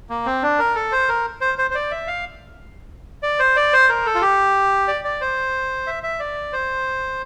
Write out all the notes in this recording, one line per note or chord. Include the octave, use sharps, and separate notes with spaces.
A#3
C4
D4
A#4
A4
C5
A#4
C5
C5
C5
D5
E5
F5
D5
C5
D5
C5
A#4
A4
F4
G4
D5
D5
C5
E5
E5
D5
C5